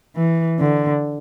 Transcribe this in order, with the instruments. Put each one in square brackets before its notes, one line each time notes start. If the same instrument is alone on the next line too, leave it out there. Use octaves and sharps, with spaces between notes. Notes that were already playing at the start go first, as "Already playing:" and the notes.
[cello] E3
D3